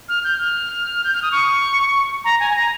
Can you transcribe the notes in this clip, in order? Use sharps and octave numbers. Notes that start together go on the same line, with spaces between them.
F6
G6
F6
G6
F6
D#6
C#6
A#5
G#5
G#5
A#5